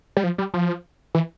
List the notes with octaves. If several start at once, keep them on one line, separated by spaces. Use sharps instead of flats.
G3
F3
G3
F3
E3